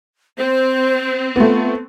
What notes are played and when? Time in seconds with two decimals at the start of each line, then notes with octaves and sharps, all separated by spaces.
0.38 C4 C5
1.36 A3 B3 F4